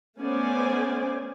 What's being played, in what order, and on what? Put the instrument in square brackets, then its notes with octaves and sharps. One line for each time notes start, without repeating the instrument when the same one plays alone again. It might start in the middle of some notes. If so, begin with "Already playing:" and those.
[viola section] A3 B3 C#4 C5 D5 G#5